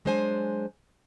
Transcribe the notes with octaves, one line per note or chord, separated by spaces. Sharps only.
F#3 G#3 D4 C5 F#5 G#5